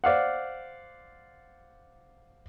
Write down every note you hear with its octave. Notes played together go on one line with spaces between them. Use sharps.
C5 D5 F5 F#5